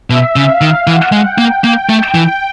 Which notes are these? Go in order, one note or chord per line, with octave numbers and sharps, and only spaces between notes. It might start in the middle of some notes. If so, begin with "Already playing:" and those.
B2 E5
C#3
F5
D#3
E3 F#5
G#3
G5
A#3
A#3
A3
E3